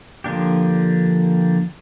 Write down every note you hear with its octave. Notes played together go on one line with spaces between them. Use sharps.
D3 F3 A#3 D4 G4